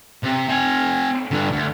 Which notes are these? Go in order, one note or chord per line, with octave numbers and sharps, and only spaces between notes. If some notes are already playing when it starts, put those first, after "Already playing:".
C3
C4 G#5
G2 D3
D2